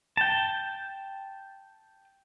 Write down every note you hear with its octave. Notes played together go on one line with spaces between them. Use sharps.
G5 A5